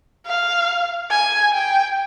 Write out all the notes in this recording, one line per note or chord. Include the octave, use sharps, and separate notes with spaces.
F5
G#5
G5